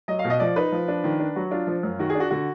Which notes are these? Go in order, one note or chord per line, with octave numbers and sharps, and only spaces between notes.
F#3 D#5
F5
B2
D#5
F3 D5
D#4 B4
F3
D4
D#3
D4
F#3 F#4
D4 F4
F3
F#2
D#3 F#4
G#4
D4
F#4
D3 F#4